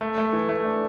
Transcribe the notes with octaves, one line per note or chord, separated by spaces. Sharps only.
A3
A3
E3
A3
D4